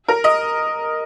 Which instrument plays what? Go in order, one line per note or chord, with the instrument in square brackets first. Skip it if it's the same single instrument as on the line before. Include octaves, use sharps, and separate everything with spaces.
[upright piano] A#4
D#5